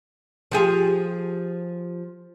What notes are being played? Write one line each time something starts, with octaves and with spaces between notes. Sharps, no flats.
F3 G4 G#4